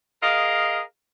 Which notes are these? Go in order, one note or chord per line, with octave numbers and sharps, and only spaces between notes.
G#4 A#4 D#5 F5